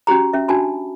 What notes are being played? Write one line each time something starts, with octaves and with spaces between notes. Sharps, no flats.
C#4 F#4 G4 A#5
C#4 E5
D4 F#4 G#5 A5 B5